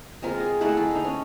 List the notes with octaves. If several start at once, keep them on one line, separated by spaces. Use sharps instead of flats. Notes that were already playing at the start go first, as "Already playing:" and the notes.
G#3 C4 F4 A#4
G#4
G#3 A3 E4 F#5
G#4 A4
A3 D#4
C#4